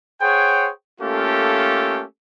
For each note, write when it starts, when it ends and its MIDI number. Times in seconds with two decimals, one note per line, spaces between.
0.21 0.70 68
0.21 0.70 72
0.21 0.70 73
0.21 0.70 78
0.21 0.70 79
1.01 2.03 57
1.01 2.03 58
1.01 2.03 61
1.01 2.03 65
1.01 2.03 67
1.01 2.03 69